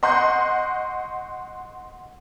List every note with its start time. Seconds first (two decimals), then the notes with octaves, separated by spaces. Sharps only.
0.03 D#5 F#5 C6 C#6 F#6 G6